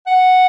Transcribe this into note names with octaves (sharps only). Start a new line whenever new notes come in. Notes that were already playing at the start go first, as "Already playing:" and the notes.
F#5